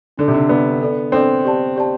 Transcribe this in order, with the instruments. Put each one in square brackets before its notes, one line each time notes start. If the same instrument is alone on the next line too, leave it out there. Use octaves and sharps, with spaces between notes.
[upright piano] D3 [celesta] D4 A4 D5
[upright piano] C3
D3
[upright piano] B3 [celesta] D4 A4 D5
[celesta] D4 A4 D5
[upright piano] C4 [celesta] D4 A4 D5
[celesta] G4 D5 A5
G4 D5 A5